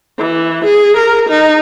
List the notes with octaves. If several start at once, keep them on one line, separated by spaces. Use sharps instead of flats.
E3
G#4
A#4
D#4